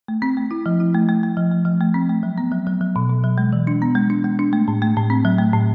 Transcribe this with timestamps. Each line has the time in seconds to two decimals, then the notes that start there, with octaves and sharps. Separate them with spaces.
0.08 A3
0.22 C4
0.37 A3
0.51 E4
0.66 F3
0.80 E4
0.94 A3
1.08 A3
1.23 A3
1.37 F3
1.52 A3
1.65 F3
1.81 A3
1.94 C4
2.09 A3
2.23 F#3
2.38 B3
2.51 F#3
2.67 F#3
2.81 F#3
2.96 B2
3.10 B2
3.24 F#3
3.38 G#3
3.53 E3
3.67 D4
3.82 B3
3.95 G#3
4.10 D4
4.24 G#3
4.39 D4
4.53 A3
4.68 A2
4.82 A3
4.97 A2
5.10 C4
5.25 F#3
5.39 A3
5.54 A2